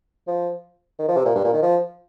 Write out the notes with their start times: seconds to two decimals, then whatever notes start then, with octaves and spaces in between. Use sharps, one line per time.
0.28 F3
0.99 D#3
1.08 F3
1.17 C3
1.25 A#2
1.35 G2
1.44 A#2
1.53 D#3
1.62 F3